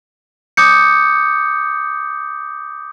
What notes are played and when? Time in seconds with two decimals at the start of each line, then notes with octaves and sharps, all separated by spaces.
0.57 D6 D#6 G6 C#7